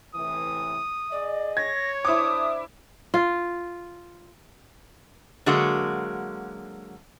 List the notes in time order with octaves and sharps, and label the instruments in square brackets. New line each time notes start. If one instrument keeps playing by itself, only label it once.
[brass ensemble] A2 C3 E3 [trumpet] D#6
[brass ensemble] G#4 D#5 [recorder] D5
[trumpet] C#5 [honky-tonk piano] G#6 [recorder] A#6
[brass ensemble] D4 C5 [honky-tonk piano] E4 D6 [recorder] D#6
[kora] F4
[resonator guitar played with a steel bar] D3 F#3 G#3 A#3 F#4